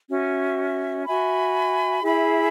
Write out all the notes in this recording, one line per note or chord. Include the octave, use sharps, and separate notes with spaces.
C#4 F#4 E5
F#4 E5 G#5 B5
E4 G#4 E5 B5